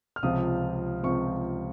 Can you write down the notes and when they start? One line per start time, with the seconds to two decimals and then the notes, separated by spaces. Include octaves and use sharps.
0.16 F6
0.23 C#2 C3 F3 D#6
1.03 C#2 C3 F3 C#6